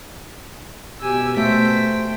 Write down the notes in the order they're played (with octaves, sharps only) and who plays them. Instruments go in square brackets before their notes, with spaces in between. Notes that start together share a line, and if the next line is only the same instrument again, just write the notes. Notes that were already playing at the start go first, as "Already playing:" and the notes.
[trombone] B2 [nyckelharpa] G4 G#5 [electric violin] E6
[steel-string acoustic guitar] A3 [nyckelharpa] C5 G5 [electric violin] B6